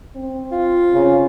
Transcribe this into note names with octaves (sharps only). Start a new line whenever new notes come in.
C4
F4
C#3